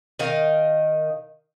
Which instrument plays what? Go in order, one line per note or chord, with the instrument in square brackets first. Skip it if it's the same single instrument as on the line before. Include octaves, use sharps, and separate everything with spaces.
[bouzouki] D#3 D#5 F5